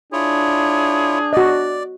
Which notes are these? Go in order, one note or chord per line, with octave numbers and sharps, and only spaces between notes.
D4 E4 F4 G#4 C#5
F#4 D5 D#5